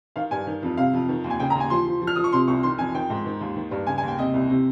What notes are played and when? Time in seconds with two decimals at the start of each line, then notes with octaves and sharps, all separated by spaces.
0.16 D#3 F5
0.31 G2 G#5
0.47 D#3
0.63 F2
0.77 C3 F5
0.93 F2
1.09 D#3
1.24 D#2
1.30 G#5
1.40 C#3 G5
1.50 A#5
1.55 D#2
1.60 G#5
1.70 F3 C6
1.86 F3
2.02 F3
2.07 F6
2.16 F3 D#6
2.24 C#6
2.32 C3 C6
2.48 C2 C#6
2.63 D#3 C6
2.78 F2 G#5
2.94 D#3 G5
3.10 G#2
3.26 D#3
3.41 D#2
3.56 D#3
3.71 G2
3.87 C#3 G#5
3.98 G#5
4.03 D#2
4.08 G5
4.18 C3 D#5
4.34 C2
4.49 C3